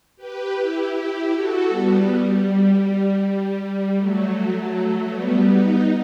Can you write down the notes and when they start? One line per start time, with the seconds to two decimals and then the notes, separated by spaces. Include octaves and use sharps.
0.16 G4 B4
0.55 E4 G4
0.93 E4 G4
1.30 F#4 A4
1.68 G3 B3
2.06 G3
3.20 G3
3.57 G3
3.95 F#3 A3
5.08 G3 B3
5.46 B3 D#4